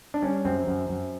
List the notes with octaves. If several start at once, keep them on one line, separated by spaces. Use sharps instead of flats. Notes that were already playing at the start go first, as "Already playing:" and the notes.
D4
G3 C#4
F#2 C4
F#2
F#2